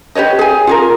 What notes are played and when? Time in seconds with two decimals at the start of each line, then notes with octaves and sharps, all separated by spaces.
0.15 G4 B4 C#5 D#5
0.39 G#4 G#5
0.67 F4 G#4 A#4